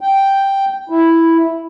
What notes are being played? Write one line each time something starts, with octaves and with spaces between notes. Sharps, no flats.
G5
E4